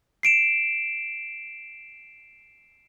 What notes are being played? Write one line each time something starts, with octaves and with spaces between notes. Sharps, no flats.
C7 D7 E7